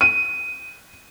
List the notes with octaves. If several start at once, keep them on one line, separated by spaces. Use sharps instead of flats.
D#7